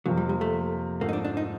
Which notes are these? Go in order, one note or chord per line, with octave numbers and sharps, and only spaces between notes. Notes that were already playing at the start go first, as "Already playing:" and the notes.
F2 C3 F3 F#3 A#3
G3
G3
A3
G#2 F3 A3 A#3
D#4
D4
D4
D#4